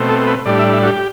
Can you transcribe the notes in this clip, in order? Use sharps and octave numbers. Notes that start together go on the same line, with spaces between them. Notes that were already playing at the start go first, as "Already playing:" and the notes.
Already playing: B2 A3 C4
A4
B4
A2 G3 D4 D5
E5
E5
F#4
G4